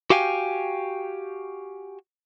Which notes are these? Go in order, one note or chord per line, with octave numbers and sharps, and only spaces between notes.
F#4 G4 F5 G5 G#5